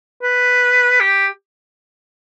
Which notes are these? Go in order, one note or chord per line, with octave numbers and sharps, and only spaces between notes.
B4
G4